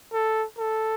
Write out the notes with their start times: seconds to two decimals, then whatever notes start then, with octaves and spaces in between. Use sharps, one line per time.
0.13 A4
0.58 A4